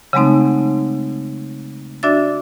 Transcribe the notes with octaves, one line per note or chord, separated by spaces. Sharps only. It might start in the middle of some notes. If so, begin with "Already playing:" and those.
C#3 F#3 G#3 A3 C4 D#4
D4 F#4 D5 E5 E6 A6